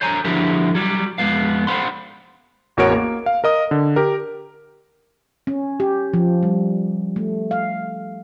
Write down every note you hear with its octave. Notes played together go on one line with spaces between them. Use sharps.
C5 C#5 G#5 A#5
D3 F3 E4 F#4 G4 A#4
F#3 G3
F2 G#3 B3 F5
C5 F5 F#5 B5 C6
A1 E2 F#4 A#4 C#5 D7
A#3
F5
A#4 D#5 D#6
D3
G4 A#4
C#4
G4
F3
G3
A3
F5